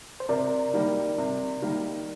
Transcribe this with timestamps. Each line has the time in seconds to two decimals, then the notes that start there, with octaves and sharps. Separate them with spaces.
0.20 C5
0.29 C3 A#4 D5
0.74 D#3 G3 A#3
1.18 C3
1.62 D#3 G3 A#3